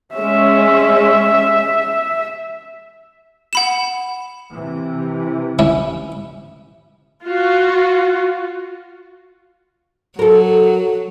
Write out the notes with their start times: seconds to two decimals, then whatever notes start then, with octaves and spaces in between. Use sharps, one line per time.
0.15 G#3 C#4 E5
3.53 F#5 B5 E7
4.53 C3 E3
5.59 C#4 E4
7.25 F4 F#4
10.19 F#3 A4 A#4